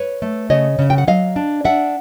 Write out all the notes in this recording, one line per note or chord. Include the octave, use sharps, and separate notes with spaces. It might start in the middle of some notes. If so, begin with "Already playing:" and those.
Already playing: B4 C#5
A3
C#3 C#5 D#5
C#3
G5
F#5
F#3 D#5 F5
D4
D4 E5 F#5